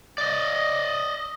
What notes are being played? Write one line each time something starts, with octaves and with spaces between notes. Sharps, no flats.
D5 D#5